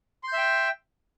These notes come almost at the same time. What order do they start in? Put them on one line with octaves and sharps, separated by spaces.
C6 G6 E5 G5